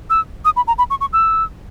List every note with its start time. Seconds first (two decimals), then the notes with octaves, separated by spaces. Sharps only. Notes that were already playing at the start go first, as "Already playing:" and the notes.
0.10 E6
0.45 D#6
0.56 B5
0.67 A#5
0.78 B5
0.90 C#6
1.01 C#6
1.13 E6